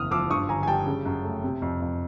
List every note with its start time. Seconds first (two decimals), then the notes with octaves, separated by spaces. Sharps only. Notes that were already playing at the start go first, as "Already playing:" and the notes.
Already playing: F#1 E2 D#6 F6
0.11 F3 D6 E6
0.30 G2 C#6 D#6
0.49 G1 G#5 A#5
0.63 G#5
0.67 G3 G5 A5
0.87 C#3
1.06 F#2
1.24 A3
1.44 C3
1.62 F2
1.81 F2